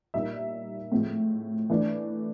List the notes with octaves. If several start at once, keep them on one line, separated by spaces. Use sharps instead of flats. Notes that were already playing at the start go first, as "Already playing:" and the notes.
A#2 G3 A#3 D#4 E5
A2 F3 G#3 C4
E3 A3 D4